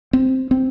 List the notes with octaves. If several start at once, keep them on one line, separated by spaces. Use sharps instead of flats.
C4
C4